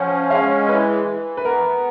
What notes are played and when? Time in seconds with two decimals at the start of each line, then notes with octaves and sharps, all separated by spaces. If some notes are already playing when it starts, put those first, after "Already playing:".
Already playing: F3 C#4 F5 F#5
0.30 G#3 F5
0.69 E3 B4
1.07 E3
1.37 B4
1.45 B3 A#4